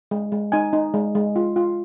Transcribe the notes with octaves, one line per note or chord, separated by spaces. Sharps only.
G#3
G#3
D#4 G#5
D#4
G#3
G#3
F4
F4